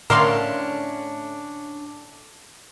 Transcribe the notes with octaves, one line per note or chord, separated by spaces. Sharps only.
A2 D3 A3 C#4 D4 A#4 F5 C6